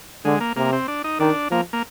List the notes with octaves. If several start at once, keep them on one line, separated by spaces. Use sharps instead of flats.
D3 G#3
A#3
C3 A#3
C4
D4
D#4
D#3 D4
F3 A#3
A#3